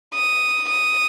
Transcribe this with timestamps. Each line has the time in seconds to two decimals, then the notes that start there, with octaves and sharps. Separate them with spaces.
0.14 D#6
0.69 D#6